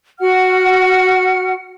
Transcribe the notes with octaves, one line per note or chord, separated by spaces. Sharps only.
F#4 F#5 F6